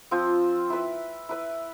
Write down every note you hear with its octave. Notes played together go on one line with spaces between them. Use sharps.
F3 C4 F4 C5
E4 B4 E5
E4 B4 E5